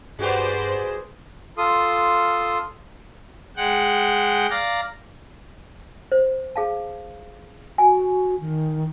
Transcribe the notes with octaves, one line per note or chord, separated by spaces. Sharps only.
G2 G#3 F#4 G4 B4 C5 D5
F4 A4 C6 D#6
G#3 F#5 G5
D5 F5 A#5
C5
G#4 F5 A5
F#4 G#5
D#3